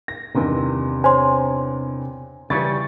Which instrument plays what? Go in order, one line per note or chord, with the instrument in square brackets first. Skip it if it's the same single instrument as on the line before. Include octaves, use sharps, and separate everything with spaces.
[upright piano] A#6
[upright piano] E2 G2 D#3 [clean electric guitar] C3
[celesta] C5 C#5 C6 [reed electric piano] G#5
[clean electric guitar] C#3 G3 C#4 [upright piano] E3 G#6 A6